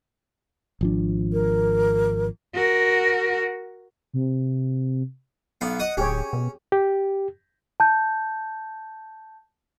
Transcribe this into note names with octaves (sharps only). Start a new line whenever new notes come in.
G#1 F3 D4
A#4
F#4 A#4
C3
B1 B3 F5
D#5 F#5 D#6
D1 C#4 G4 G#4 C#5
B2
G4
A5 G6